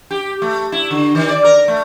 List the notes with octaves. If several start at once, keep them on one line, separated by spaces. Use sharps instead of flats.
G4
A3
E4
D3
D#3
D5
A#4
A3